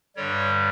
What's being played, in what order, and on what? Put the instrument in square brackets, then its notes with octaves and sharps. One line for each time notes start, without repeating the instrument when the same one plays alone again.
[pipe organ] G2 D3 G3 C#5